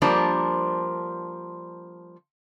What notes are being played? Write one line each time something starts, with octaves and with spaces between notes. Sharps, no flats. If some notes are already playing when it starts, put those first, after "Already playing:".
F3 G3 A#3 D4 A#4 C5